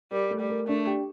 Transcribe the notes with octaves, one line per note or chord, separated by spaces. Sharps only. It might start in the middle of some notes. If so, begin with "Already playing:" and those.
G3 A#4
A3
G3
A#4
A3 D4
G4